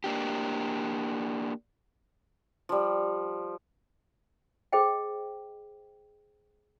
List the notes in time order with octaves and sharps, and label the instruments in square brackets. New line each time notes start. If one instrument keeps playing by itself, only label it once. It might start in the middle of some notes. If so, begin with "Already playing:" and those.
[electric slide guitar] A#3 D4 G4
[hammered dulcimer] F3 G3
[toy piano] G#4 C5 D#5 G5